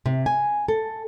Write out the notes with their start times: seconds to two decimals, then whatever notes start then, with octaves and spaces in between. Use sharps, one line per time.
0.06 C3
0.26 G#5
0.68 A4